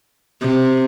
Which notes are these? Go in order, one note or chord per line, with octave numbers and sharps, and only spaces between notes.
C3